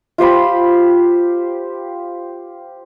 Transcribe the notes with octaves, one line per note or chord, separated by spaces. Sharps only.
F4 G4 C5 B5